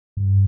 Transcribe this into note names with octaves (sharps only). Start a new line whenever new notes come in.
G2